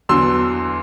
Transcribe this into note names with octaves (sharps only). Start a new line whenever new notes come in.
E2 D3 F#3 C6 E6